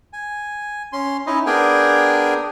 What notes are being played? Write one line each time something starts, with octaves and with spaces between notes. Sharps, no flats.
G#5
C#4 C6
C#4 D#4 E4 D#5
B3 D4 G#4 A#4 G5 G#5